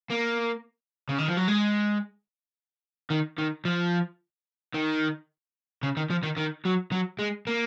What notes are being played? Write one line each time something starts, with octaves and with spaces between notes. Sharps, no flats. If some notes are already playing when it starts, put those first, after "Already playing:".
A#3
C#3
D#3
F3
F#3
G#3
D#3
D#3
F3
D#3
C#3
D#3
F3
D#3
D#3
F#3
F#3
G#3
A#3